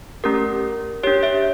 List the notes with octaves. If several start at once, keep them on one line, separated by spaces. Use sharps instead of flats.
A3 C#4 G4 A#4
D4 G4 C#5
C#5 E5